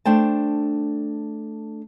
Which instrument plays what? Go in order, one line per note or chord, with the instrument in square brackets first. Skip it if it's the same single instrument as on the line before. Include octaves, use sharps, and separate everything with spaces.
[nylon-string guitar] A3 D4 C5 G5 A5